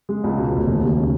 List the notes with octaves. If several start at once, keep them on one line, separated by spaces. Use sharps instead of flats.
G#3
C#2
B2
F1
D#2
D#2
C#3